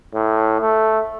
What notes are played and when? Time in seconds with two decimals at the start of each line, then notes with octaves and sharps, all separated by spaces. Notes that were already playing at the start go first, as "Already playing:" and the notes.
0.15 A2
0.61 A3